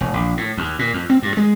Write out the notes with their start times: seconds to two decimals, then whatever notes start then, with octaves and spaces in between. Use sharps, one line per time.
0.01 E1
0.14 A#1
0.37 A2
0.57 D#2
0.79 A#2
0.94 F2
1.10 C4
1.22 G2
1.37 G#3